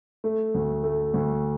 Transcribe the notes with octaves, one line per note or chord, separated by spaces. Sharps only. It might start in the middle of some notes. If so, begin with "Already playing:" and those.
A3
D2
A3
D2